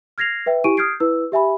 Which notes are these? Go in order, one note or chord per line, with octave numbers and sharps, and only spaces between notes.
F6 G#6 A#6 C7 F7
B4 E5 G5
E4 G4 G#5 C#6 D7 D#7
D#6 F6 G6 G#6 C7 D7
E4 B4 E6
G4 E5 G#5 B5